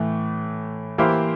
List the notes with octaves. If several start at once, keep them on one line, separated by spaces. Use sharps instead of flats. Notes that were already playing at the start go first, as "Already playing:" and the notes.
Already playing: A2 E3 A3
E3 A#3 E4 G4 C5